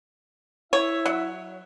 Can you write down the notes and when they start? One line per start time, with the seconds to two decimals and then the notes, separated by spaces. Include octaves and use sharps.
0.73 E4 C#5 E5
1.06 F#3